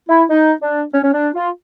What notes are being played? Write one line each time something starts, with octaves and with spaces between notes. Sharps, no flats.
E4
D#4
D4
C#4
C#4
D4
F4